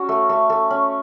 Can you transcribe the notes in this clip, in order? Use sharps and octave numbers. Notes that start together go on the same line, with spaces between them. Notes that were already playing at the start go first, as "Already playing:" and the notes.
Already playing: C#4 F#4
A3
A3
A3
C#4